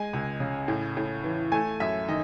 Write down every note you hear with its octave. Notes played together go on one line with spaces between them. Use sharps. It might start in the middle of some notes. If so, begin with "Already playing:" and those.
Already playing: G#3 G#5
C#2
C#3
A2
A2
E3
A3 G#5
F#2 E5
D#3 D#5